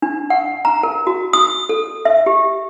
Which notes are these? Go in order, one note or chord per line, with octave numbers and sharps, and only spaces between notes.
D4
F#5
A#5
A#4
F#4
D#6
A4
E5
G4